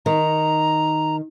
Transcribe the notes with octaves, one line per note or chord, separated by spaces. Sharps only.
D#3 A#5